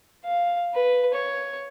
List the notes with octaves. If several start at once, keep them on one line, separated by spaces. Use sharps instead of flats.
F5
B4
C#5